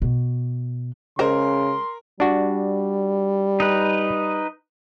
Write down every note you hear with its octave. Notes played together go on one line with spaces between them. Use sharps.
B2
C#3 G#3 A#4 C5 A#5 C6
G3 D4 F#4
D#4 B4